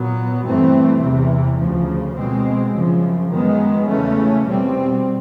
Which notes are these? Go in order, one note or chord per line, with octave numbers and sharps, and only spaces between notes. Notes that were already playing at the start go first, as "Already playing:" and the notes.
Already playing: A#2 F#3 B3
G2 E3 A3 C4
E2 C3 E3
D2 C#3 F3
B2 G#3 C4
F#2 C#3 F3
F#2 D#3 G#3 B3
E2 C#3 E3 A3 C#4
B2 G3 C4